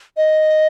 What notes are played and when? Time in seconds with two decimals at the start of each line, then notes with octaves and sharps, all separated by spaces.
0.17 D#5